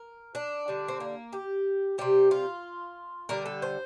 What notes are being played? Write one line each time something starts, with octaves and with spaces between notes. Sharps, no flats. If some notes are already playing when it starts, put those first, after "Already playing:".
Already playing: A#4
D4
D3 G3
C4
A#3
G4
C3 G3 G4
F4
D3 G3 A#4
A4
C5